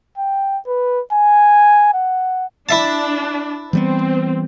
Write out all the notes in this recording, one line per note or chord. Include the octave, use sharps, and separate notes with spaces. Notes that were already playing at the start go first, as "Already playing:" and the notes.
G5
B4
G#5
F#5
D4 E4 E5 A5
E3 G3 B3 C4